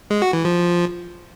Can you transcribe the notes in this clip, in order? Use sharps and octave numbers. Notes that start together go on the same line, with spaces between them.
G#3
F#4
E3
F3